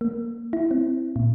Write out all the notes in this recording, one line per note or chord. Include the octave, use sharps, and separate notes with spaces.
A#3
E4
C4
A#2